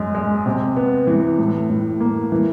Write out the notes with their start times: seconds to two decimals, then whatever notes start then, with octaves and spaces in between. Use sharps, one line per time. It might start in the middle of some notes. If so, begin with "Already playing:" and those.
Already playing: F#2 G#3
0.15 G#3
0.46 C3
0.76 B3
1.07 E3
1.38 A2
1.70 A2
2.00 A#3
2.32 E3